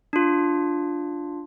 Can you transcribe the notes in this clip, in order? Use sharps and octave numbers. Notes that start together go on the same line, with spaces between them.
D4 F4